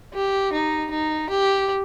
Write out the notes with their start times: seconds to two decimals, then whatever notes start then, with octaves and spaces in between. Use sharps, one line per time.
0.14 G4
0.53 D#4
0.91 D#4
1.30 G4